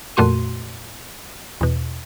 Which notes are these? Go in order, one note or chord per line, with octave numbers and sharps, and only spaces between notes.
F2 A#2 A3 F#4 C6 D#7
E2 B2